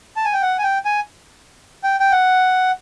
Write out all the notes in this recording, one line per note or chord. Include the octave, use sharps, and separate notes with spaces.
A5
G#5
G5
F#5
G#5
G5
G#5
G5
G5
F#5